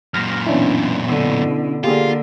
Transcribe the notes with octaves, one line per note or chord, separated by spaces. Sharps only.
F#2 A#2 F6 A#6
B2 E3 C#4 D4 E4
B2 D3
D3 A#3 F4 G4 G#4